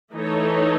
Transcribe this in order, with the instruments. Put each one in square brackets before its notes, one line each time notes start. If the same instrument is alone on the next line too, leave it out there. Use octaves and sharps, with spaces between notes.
[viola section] E3 A3 D#4 [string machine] A4 C#5